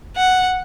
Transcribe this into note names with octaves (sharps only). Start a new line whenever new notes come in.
F#5